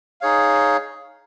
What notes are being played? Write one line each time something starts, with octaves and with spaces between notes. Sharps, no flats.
D#4 G#4 C#5 F5